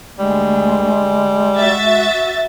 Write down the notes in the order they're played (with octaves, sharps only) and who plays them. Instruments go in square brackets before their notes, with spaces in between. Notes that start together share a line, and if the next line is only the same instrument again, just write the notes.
[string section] D2 [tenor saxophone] G3 [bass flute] G#3
[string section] F#4 E5 A6